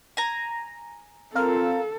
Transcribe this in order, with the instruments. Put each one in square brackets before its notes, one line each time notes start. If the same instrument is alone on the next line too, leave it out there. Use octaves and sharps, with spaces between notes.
[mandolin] G#5 A#5
[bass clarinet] C4 [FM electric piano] F4 A#4 F5 [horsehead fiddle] A4